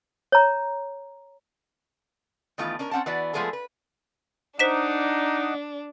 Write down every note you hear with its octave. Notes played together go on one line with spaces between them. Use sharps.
C#5 A#5
D#3 E3 A3 B3 F4
C#4 D4 A#4
C4 C#4 F#5 G5 A5
E3 B3 F#4 D5
F3 G#3 A3 B3 G#4 A4
B4
D4 D#4 C5 D#5 F#5 D6 B6 E7